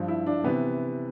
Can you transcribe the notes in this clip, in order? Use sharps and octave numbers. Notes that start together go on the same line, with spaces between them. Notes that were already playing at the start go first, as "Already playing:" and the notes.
Already playing: G2 F3
E4
D4
C3 E3 B3